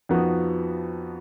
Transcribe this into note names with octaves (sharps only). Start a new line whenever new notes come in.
F2 F3 B3 D#4 F#4